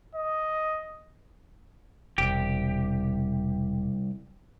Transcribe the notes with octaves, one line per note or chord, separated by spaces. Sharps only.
D#5
E1 C2 G4